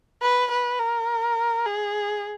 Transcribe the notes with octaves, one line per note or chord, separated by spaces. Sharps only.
B4
B4
A#4
G#4